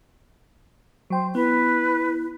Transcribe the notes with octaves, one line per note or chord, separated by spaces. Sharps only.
F#3 C5 G5
B3 E4 B4